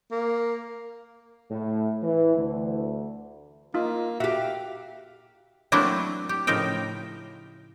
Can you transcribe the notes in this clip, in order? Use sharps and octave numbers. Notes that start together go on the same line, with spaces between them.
A#3
A2
E3
D2
A#3 D#4 F4
F#4 G4 E5 F5
F#3 A3 A#3 C4 D4 E4
G4
A2 C#3 F3 D#4 A#4 G5